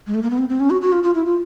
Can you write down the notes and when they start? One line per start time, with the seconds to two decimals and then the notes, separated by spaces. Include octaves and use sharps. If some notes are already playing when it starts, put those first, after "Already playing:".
0.07 G#3
0.14 A3
0.23 A#3
0.30 B3
0.38 C4
0.49 C4
0.60 C#4
0.70 F#4
0.82 F#4
0.93 F4
1.03 F4
1.15 E4
1.26 F4